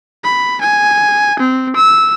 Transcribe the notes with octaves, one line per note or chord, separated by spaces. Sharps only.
B5
G#5
C4
E6